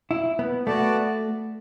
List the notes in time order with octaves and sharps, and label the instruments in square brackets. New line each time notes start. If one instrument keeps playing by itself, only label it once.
[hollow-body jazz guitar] E4
B3
[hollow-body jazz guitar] A3 [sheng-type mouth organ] B3 F#4 D5 A5